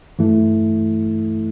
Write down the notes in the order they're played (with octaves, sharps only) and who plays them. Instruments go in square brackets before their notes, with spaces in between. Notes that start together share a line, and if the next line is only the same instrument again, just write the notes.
[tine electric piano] G2 E3 A3 E4